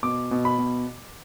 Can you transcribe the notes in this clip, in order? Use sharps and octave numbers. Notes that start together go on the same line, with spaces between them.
B2 D6
B2
B5
B2